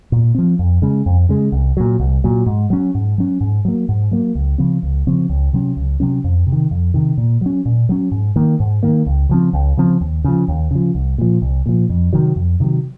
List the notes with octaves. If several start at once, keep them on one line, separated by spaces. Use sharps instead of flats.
A#2
F3 C4
F2
C#3 G#3
F2
C#3 G#3
C2
A#2 F#3
C2
A#2 F#3
G#2
F#3 C#4
G#2
F#3 C#4
G#2
F#3 A#3
G#2
F#3 A#3
C#2
C#3 F3 C4
C#2
C#3 F3 C4
C#2
C3 F#3 C#4
C#2
C3 F#3 C#4
F2
C3
D#3
F2
C3 D#3
A#2
F#3 C#4
A#2
F#3 C#4
G#2
D#3 A#3
G#2
D#3 A#3
C#2
C#3 F3 C4
C#2
C#3 F3 C4
D#2
C#3 F3
D#2
C#3 F3
C2
A#2 F3
C2
A#2 F3
F2
C3 D#3 F#3
F2
C3 D#3 F#3